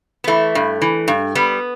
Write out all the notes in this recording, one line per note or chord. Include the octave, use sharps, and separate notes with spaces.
B3
E3 A3
G2
E3
G2
G3 B3